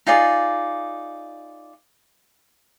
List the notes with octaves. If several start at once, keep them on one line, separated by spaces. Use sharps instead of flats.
D#4 F4 G#4 D5